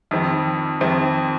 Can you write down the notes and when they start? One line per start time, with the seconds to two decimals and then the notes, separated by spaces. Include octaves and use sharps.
0.11 F2 D#3 C4
0.81 F2 D#3 C4